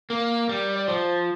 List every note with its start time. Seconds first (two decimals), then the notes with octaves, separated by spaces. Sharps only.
0.10 A#3 A#4
0.49 G3
0.76 D5
0.88 F3 C5